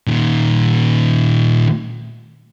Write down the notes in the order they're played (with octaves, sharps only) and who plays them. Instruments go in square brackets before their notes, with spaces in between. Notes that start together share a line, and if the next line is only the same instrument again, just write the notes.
[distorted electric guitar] A#2 D#3